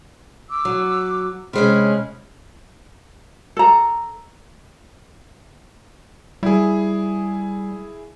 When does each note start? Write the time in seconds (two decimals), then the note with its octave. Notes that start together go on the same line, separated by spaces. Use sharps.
0.50 D6 E6
0.65 F#3
1.53 C3 G#3 C#4 C#5 B5 F6
3.57 A4 A#5
6.43 G3 E4 G#4